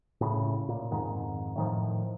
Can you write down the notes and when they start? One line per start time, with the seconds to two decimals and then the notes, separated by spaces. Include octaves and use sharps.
0.21 A2 C#3
0.69 A#2
0.91 F2 G#2 D#3
1.56 A2 D#3 F3